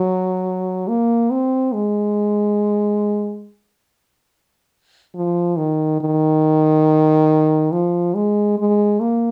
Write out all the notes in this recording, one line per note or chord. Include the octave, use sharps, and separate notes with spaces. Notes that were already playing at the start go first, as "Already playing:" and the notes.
Already playing: F#3
A#3
C4
G#3
F3
D#3
D#3
F3
G#3
G#3
A#3